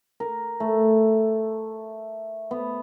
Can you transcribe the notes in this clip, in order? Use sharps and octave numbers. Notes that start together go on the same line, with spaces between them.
A#4
A3
B3